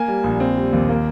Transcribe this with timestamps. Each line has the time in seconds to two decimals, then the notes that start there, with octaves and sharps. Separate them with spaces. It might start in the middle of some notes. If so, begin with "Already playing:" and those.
Already playing: A#3 G#5
0.08 G3
0.24 A#1
0.40 C4
0.57 G3
0.73 D#2
0.89 A#3